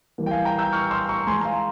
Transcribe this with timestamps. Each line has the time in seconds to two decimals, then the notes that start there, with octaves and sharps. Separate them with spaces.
0.18 E3 G3 A#3
0.26 G5
0.31 F5 G#5
0.45 G5 A#5
0.58 E6 G6
0.72 C#6 F6
0.91 C6 E6
1.09 A#5 C#6
1.27 E3 G#3 G#5 C6
1.41 A#5
1.45 F5 G#5